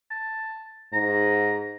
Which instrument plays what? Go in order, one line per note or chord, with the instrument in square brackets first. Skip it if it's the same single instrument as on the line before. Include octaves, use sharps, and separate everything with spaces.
[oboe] A5
[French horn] G#2 [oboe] A#5